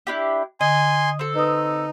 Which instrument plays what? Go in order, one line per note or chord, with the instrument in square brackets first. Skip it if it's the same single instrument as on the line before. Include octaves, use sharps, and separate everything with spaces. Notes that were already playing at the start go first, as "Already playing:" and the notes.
[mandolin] D4 E4 G4
[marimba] D3 [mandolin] D#5 [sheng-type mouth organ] G#5 C6
[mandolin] C4 A4
[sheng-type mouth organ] D#4 [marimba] B4 D#6